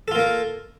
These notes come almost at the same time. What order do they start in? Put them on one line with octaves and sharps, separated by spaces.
A4 F4 A#3 A#4